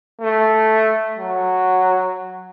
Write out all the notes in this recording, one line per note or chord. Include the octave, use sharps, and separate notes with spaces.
A3
F#3